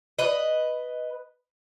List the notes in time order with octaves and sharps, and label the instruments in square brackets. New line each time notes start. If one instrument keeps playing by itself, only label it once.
[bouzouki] B4 D#5